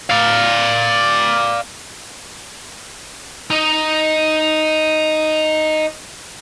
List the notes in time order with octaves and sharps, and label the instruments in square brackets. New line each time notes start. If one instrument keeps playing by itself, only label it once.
[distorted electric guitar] D5 F5
D#4 D#5